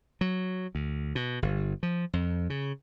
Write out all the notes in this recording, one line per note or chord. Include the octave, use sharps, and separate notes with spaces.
F#3
D2
B2
G1
F3
F2
C#3